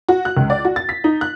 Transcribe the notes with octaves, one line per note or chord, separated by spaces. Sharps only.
F#4
F#6
C#2
D5
F#4
A6
B6
D#4
F#6